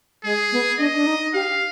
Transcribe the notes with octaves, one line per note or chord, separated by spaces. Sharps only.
G#3 G#4
B3
D4 D#5
D4
D#4
G4 F5